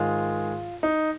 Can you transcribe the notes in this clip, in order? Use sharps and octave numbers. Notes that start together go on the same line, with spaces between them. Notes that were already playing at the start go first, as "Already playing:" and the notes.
Already playing: G#2 D#3 G#3 F4
D#4